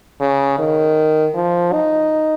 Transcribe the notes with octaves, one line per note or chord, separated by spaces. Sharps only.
C#3
D#3
F3
D#4